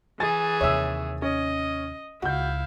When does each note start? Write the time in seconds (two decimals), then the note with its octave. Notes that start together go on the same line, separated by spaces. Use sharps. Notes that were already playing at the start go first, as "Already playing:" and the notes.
0.20 E3 G#4 G#5 A6
0.61 D#2 C3 C#5 E5 E6
1.22 C#4 D#5
2.22 C#2 E4 F#4 F5 G6